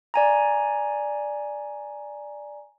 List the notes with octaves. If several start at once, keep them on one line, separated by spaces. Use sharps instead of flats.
D5 G#5 A#5